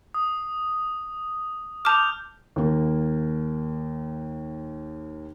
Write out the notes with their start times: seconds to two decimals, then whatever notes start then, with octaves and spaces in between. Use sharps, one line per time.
0.14 D#6
1.85 A5 D6 F6 G6 F7
2.56 D#2 A#3